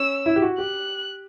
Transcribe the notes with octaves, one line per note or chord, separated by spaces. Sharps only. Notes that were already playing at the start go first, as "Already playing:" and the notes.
Already playing: C#4 E6
E4
G4
F#4
G4 F#6